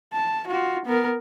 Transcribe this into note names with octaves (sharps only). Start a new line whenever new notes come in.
A5
F4 F#4
B3 A#4